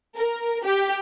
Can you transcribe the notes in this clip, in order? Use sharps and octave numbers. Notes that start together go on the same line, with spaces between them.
A#4
G4